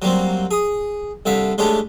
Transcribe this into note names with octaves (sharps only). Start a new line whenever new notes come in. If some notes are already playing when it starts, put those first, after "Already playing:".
F#3 G3 A#3 C4
G#4 D#6
C2 D3 E5 F5
G#3 A3 C#4 D4 G4